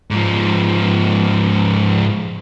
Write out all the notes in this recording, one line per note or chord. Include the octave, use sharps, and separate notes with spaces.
G#2 F3